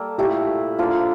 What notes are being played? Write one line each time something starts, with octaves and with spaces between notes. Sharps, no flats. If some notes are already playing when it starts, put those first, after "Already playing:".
Already playing: G3 A#3 A4
A#2 A3 E4 G4
D3 F3 A#3 F4